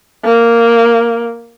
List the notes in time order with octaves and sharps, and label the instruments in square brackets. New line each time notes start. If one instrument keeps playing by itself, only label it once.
[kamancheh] A#3